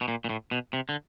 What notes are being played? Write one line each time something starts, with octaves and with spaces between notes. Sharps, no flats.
B2
A#2
A#2
A2
B2
C3
D3